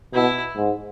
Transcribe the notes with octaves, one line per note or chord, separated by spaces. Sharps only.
B2 E4
G#2